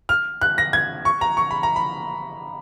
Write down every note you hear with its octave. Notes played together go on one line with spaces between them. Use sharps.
F6
F#6
A#6
G#6
C#6
A#5
C#6
B5
A#5
B5